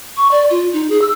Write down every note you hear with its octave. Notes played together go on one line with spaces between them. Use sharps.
C#6
D5
F4
D#4
G#4
E6